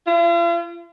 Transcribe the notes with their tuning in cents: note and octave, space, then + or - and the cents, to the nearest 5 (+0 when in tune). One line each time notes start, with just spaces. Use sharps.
F4 -45